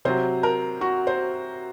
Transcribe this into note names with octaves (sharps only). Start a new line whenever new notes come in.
C3 F#3 C5
A#4
F#4
C5